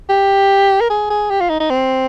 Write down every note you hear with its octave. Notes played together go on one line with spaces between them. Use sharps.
G4
A#4
G#4
G#4
G4
F4
D#4
D#4
C4